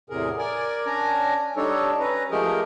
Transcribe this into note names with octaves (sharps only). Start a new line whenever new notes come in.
E2 A2 C3 G#4 A#4
A#4 D5 G#5
C#4 D4 G#5 A#5
G3 D4 D#4 A4 C#5
C#4 B4 A#5
F3 G#3 A3 G4 G#4 A#4